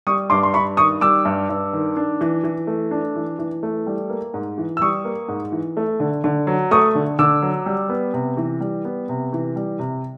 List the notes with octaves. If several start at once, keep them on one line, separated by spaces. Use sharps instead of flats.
G3 C#6 D#6
G2 C6 D6
C6
G2 B5 C#6
D#3 C#6 D#6
G3 D6 E6
G2
G2
D#3
D4
E3
E3
A3
D4
E3
E3
A3
G3
A#3
G#2
E3
E6
G3 C#6 D#6
A#3
G#2
E3
A3
D3
D3
F#3
A3 C#6 D#6
D3
D3 D6 E6
F#3
G3
B3
C3
E3
G3
B3
C3
E3
G3
C3